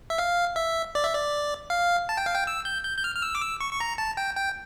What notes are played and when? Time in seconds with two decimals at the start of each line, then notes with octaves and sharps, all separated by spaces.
0.10 E5
0.18 F5
0.56 E5
0.95 D5
1.04 E5
1.14 D5
1.70 F5
2.09 A5
2.17 G5
2.26 F5
2.35 G5
2.47 E6
2.65 G6
2.84 G6
2.98 G6
3.04 F6
3.15 F6
3.22 E6
3.35 D6
3.42 E6
3.61 C#6
3.73 C#6
3.80 A#5
3.98 A5
4.17 G5
4.37 G5